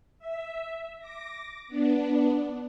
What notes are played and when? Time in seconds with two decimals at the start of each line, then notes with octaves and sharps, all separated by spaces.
0.19 E5
0.99 D6 A#6
1.68 B3 D4